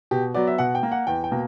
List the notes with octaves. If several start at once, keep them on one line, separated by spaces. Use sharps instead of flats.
B2 G4
F#3 B3 D5
E5
B2 F#5
G5
A#3
F#5
E2 G5
G5
B2 A#3